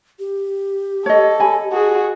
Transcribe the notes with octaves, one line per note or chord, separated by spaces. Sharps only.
G4
A4 C#5 D#5
D#5 G#5 B5
F#4 G#4